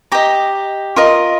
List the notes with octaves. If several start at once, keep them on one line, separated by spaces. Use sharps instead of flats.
G4 D#5 A#5
F4 A#4 D#5